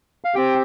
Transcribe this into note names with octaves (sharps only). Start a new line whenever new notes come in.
F5
C4 G4 G5